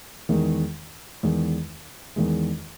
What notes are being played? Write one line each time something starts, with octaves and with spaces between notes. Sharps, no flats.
E2 D#3 G#3
E2 D#3 G#3
E2 D#3 G#3